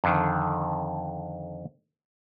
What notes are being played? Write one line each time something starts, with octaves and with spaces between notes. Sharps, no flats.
F2 D3 D#3